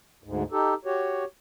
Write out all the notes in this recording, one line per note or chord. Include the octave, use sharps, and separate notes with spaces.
D2 G#2
D#4 G4 A4
F#4 G4 C#5